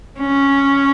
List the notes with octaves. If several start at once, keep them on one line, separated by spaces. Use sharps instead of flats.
C#4